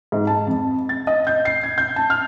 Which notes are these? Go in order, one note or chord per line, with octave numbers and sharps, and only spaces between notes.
G#2
A5
F2
A6
D#5
G6
C7
G#6
G6
A5
F6